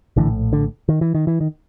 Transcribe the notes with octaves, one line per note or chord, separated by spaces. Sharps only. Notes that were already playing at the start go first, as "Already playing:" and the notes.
A#1 A2 D3 E3
D3
D#3
E3
D#3
E3
D#3